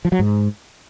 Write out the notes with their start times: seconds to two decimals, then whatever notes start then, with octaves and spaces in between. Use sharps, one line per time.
0.05 F3
0.12 F#3
0.19 G#2